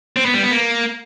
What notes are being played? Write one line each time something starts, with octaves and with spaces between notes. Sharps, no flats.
C4
B3
G3
B3
A#3